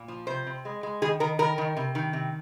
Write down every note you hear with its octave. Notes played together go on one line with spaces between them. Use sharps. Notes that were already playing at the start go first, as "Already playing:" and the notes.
Already playing: A#2
F3
C3 C5
C3
G#3
G#3
D#3 G#4
D#3 A#4
D#3 A#4
D#3
C3
D#3
C3